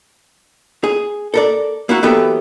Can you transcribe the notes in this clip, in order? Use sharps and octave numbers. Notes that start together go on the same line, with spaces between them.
G#4
A4 A#4 D5
A#3 E4 F#4
E3 F#3 B3 G4 A4 A#4